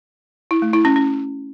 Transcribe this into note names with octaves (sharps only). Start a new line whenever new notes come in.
E4
A3
E4
C#4
C#4